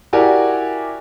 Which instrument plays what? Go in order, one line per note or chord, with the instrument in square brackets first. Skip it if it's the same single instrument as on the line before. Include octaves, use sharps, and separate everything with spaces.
[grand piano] E4 F#4 G4 A#4 D5 G#5